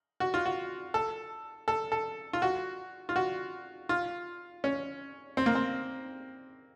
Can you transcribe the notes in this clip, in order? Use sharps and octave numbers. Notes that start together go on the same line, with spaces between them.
F#4
F4
F#4
A4
A4
A4
F4
F#4
F4
F#4
F4
C#4
C4
A#3
C4